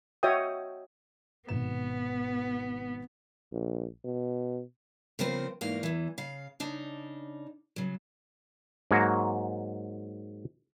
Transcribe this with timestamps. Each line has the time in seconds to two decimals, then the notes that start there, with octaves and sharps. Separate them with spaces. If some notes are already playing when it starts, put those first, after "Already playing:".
0.23 F#4 C#5 D#5 E5 G5 D#6
1.49 G#1 B2 B3 E7
3.53 A#1
4.05 B2
5.19 C#3 F3 B3 C4 A#4 C5
5.61 E2 G#2 A#3 D#4 F5
5.83 E2 E3
6.18 C#3 F5
6.60 C#3 D4 D#4
7.76 C#3 F#3
8.91 G#2 F#3 A#3 F#4